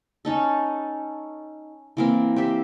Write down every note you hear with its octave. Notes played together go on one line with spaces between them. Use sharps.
C#4 D#4 A4
E3 A#3 C4
G4 C5 E5